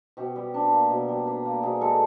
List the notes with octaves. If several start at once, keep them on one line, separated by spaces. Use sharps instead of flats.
B2 G4
G3
D4
A#3
B2
G3
D4
A#3
B2 G#4
G#3 A4